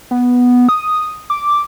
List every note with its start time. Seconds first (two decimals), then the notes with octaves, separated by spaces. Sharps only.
0.11 B3
0.69 D#6
1.30 D6